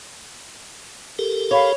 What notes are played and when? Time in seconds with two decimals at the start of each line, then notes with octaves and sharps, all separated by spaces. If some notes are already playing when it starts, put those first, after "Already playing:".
1.19 G4 A4 A#4
1.51 C#5 F5 B5